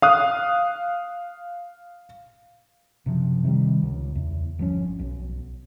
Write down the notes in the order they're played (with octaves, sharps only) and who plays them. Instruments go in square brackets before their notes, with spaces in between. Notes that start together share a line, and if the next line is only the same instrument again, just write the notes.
[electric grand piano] F5 D#6 F#6
[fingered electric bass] F#1 C3 F3
C3 D#3 F#3 G3
C#2
E2
G1 F3 C#4
B1